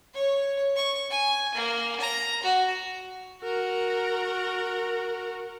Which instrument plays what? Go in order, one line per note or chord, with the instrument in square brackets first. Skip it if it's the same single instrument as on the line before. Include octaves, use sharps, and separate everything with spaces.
[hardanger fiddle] C#5
C#6
G#5
A#3
A#5
F#4
[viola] F#4 A#4